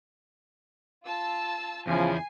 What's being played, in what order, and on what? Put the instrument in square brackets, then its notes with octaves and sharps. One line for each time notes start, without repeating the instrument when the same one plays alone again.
[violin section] F4 A5 E6
[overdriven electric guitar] E2 E4 [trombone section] C#3 F3 [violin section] G#5 C7